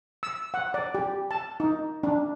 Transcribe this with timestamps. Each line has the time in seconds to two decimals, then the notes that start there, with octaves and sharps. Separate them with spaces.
0.23 E6
0.54 F#5
0.74 D5
0.95 G4
1.31 A5
1.60 D#4
2.03 D4